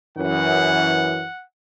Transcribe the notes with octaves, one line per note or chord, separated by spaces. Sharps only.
F#2 E3 F#5